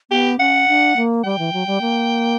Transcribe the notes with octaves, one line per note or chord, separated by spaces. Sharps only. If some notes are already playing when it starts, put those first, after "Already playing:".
B3 G4
C#4 F#5
D4
A#3
G3 G5
E3
F#3
G3
A#3